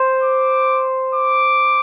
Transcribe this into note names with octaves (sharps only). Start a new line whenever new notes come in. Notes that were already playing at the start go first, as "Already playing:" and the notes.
Already playing: C5
D6
D6